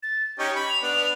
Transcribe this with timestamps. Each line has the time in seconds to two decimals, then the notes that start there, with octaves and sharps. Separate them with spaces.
0.03 A6
0.39 C#4 D#4 G4 C#6
0.56 B5
0.69 F7
0.82 B3 D4